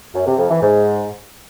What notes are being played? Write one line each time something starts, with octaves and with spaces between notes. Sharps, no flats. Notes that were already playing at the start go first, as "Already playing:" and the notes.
F#2
C3
F2
E3
G#2